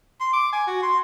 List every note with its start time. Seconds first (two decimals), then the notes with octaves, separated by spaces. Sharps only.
0.20 C6
0.33 D6
0.53 G#5
0.67 F#4
0.82 C6